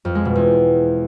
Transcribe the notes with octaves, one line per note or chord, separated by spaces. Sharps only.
F2
G#3
B2
E2